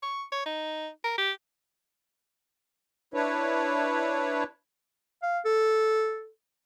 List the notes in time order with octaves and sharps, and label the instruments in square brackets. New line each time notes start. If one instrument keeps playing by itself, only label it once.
[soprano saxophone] C#6
C#5
D#4
A#4
G4
[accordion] D4 E4 B4 C#5
[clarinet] F5
A4